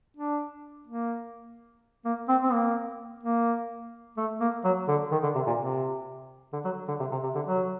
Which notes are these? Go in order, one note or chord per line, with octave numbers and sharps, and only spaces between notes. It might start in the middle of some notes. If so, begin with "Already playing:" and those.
D4
A#3
A#3
C4
C4
A#3
A#3
A3
A#3
F#3
D3
D#3
D3
C3
A#2
C3
D3
F#3
D3
C3
C3
C3
D3
F#3